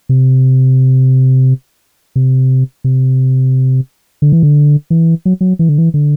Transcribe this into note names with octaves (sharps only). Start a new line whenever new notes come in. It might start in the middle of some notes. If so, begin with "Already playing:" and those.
C3
C3
C3
D3
E3
D3
E3
F#3
F#3
E3
D3
E3
D3